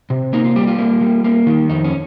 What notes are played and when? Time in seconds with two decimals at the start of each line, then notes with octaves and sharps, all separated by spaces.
0.10 C3
0.33 A#3 D#4
0.44 F4
0.56 G3 G4
0.67 F4
0.79 A#3
1.01 G3
1.24 A#3
1.47 D#3
1.70 F2 D#4
1.84 C#4